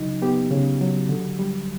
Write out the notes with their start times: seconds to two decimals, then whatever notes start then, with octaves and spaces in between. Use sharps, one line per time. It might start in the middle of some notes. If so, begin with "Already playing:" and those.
Already playing: C#3 F#3 D#4
0.22 B3 G4
0.51 C#3
0.81 F#3
1.09 D3
1.39 G3